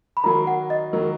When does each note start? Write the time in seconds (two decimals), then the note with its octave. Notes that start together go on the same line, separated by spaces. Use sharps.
0.17 B5
0.23 D#3 F#3 A#3 A#5
0.47 F#5
0.70 D#5
0.93 D#3 F#3 A#3